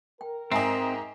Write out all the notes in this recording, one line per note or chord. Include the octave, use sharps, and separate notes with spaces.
A#4 G5
G#2 C4 D#5 E5 G5 G#5